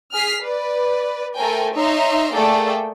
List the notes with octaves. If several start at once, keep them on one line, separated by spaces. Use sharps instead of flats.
G#4 F6 B6 C7
B4 D5
A3 A4 A#4 C5 G5 G#5
D#4 C#5 E5 A#5 C6
A3 A#3 G#4 A4 D5 G5